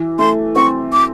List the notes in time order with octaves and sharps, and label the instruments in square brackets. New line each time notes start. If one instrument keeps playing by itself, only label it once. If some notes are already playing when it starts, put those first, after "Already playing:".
Already playing: [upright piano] E3
[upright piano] A3 [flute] C6
[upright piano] C4 [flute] C#6
[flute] D6